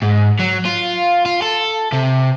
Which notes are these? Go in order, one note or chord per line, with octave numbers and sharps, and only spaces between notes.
G#2
F#3
F4
F4
A4
C3